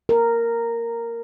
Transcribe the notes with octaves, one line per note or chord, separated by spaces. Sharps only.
A#4